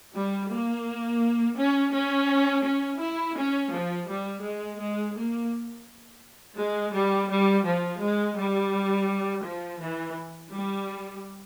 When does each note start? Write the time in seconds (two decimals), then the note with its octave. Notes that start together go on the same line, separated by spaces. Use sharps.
0.14 G3
0.50 A#3
1.57 C#4
1.93 C#4
2.64 C#4
3.00 E4
3.36 C#4
3.72 F3
4.08 G3
4.43 G#3
4.79 G#3
5.15 A#3
6.58 G#3
6.94 G3
7.30 G3
7.65 F3
8.01 G#3
8.37 G3
9.44 F3
9.79 E3
10.51 G3